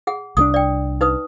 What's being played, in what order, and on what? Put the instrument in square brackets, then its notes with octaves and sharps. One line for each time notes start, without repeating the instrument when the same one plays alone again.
[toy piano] G#4 F#5
[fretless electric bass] C2 G#3 D4 [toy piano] D#6
[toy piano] D5 G5
D#4 B4 D#6